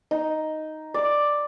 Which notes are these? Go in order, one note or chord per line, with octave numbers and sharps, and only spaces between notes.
D#4
D5